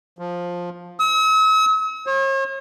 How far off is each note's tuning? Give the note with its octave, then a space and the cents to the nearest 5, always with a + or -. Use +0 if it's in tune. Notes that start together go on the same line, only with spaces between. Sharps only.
F3 +10
E6 -45
C#5 -45